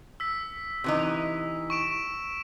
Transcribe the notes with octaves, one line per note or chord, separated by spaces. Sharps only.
E6 B6
C3 E3 D#4
C#6 D7 E7